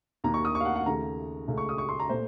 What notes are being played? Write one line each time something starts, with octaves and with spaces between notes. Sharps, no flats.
D#2 D#3 A#3 A#5
C#6
D#6
C#6
F5
F#5
F#5
D#2 C#3 A3 A#5
C#2 C#3 A3
C#6
D#6
C#6
C6
A#5
A#2 A3 C5